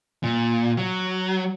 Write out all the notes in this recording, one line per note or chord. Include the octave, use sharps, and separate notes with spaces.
A#2
F#3